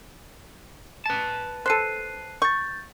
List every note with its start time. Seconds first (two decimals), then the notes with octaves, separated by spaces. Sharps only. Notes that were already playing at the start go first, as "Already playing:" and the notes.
1.06 B4 A5
1.66 A4 C5 F#6 C7 D#7
2.42 C#6 G6 A6